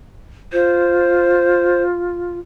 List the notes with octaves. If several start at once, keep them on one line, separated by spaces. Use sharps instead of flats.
F4 C5